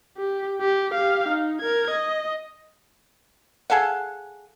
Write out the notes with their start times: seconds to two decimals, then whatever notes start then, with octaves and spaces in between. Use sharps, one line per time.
0.17 G4
0.61 G4
0.94 G4 F5
1.28 D#4
1.60 A#4 G#6
1.91 D#5
3.70 G#4 A4 F5 F#5